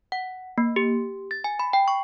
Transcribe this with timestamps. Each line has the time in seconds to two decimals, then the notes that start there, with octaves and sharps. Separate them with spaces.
0.12 F#5
0.58 A#3
0.76 G4
1.31 A6
1.44 G#5
1.59 B5
1.73 G5
1.88 C#6